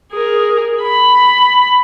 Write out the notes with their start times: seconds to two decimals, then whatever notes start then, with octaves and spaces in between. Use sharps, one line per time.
0.12 G#4 A#4
0.82 B5